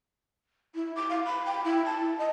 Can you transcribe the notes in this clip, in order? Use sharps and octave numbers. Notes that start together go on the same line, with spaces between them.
E4
D6
F5
B5
G5
E4
A5
D#5